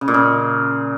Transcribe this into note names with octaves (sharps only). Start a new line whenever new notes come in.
C#3
A#2
C#3